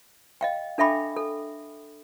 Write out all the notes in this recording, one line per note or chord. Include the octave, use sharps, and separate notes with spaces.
D#5 F5 G5
D4 A4 E5 G5 B5 D6
A4